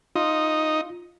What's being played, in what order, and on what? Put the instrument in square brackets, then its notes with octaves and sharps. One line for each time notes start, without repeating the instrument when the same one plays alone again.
[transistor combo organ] D#4 [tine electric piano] F4